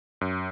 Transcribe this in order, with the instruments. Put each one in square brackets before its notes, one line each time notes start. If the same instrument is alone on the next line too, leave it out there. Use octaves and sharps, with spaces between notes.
[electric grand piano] F#2